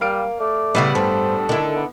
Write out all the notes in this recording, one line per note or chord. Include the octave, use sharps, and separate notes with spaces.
G3 A#3 F5 F6 D7
A3 D5
A2 C#3 G3 B3 E4 F5
G2 A4 C5
D3 D#3 E4
B3